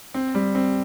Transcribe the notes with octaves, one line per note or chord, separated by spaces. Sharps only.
C4
G3
C4